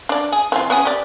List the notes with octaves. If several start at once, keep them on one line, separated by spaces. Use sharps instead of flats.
D4 D5
G#4
E3 C4 F4
B3 C#4 G#4
G4 D5